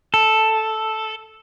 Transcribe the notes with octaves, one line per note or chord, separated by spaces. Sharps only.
A4